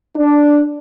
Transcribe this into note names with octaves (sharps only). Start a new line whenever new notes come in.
D4